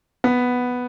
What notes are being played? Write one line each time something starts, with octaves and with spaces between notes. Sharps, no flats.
B3